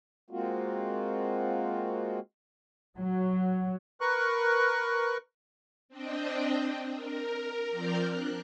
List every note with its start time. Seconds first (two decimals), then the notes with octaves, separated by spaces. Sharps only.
0.30 G#3 A#3 C4 F4 F#4
2.98 F#3
4.01 A#4 B4 C#6 F#6
5.89 C4 D4 D#5 G5
6.92 A#4
7.70 F3 C4 A#4 D5 F6 G6
8.08 D4 F#6